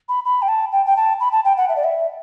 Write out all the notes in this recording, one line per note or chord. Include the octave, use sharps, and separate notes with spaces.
B5
B5
G5
A5
G5
G5
A5
B5
A5
G5
F#5
E5
D5
E5